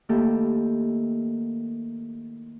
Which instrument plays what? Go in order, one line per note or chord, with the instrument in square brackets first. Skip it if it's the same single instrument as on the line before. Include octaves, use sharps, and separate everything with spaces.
[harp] D#3 A3 A#3 E4 G4 A4